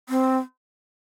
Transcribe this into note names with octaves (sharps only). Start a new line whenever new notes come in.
C4